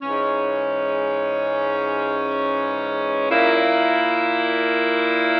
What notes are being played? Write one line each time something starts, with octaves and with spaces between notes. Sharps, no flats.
G#2 E3 G#3 C#4
A#2 A#3 E4